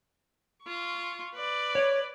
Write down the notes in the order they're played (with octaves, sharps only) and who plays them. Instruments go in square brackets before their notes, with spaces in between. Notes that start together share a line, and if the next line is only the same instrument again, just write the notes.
[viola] F4 C#6
B4 D5
[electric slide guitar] C#5